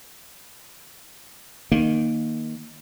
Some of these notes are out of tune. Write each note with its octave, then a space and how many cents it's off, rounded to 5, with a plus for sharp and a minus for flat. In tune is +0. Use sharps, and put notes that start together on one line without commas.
D#3 -5 A#3 +0